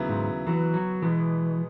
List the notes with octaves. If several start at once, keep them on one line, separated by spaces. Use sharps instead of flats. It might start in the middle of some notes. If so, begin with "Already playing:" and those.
Already playing: D#2 C#3 F#3 B3 E4
G#2
E3 F#3 B3 F#4
F#3
B2 E3 G#3 B3